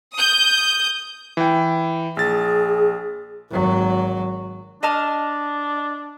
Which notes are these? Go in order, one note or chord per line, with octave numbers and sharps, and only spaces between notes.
D#6 G6
E3 G5
A#1 G#4 A6
G#1 F#3
D4 D#5 A5 F6